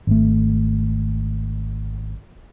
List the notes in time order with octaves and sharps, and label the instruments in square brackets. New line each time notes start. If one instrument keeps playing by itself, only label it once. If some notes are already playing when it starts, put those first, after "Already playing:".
[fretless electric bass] G#1 A3